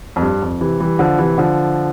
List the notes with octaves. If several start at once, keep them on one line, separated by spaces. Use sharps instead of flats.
F2
G2
F2
C3 E3
E3 G3
D3 F3
C3 E3
D3 F3